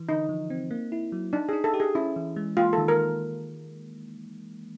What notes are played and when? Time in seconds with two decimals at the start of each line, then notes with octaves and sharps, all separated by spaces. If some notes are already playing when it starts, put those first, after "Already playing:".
Already playing: E3
0.08 D3 D#4
0.29 F3
0.50 C4
0.71 A#3
0.92 E4
1.12 F#3
1.33 D4 D#4
1.49 D#4 G#4
1.64 A4
1.74 G4
1.80 G#4
1.95 C#4 E4
2.16 E3
2.36 G#3
2.57 A#3 F4
2.73 D#3 A4
2.88 A#4